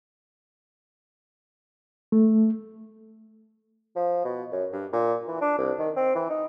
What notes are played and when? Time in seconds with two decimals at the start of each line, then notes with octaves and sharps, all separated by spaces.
2.12 A3
3.96 F3
4.25 B2
4.52 F#2
4.73 G2
4.93 A#2
5.28 E3
5.41 D4
5.58 C2
5.79 D#3
5.96 C4
6.15 E3
6.30 D#4